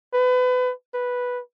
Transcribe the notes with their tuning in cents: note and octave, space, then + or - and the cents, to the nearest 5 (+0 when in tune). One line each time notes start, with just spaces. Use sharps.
B4 +30
B4 -5